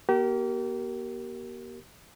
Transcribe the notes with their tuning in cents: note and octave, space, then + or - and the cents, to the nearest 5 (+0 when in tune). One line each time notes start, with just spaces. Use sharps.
A#3 +45 G4 -35 A#4 +0